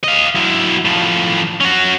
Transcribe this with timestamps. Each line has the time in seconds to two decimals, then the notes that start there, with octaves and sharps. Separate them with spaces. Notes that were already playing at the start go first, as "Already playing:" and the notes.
0.04 D#5 F5
0.35 F#3 E4
0.85 A2 F3
1.61 C#4 F#4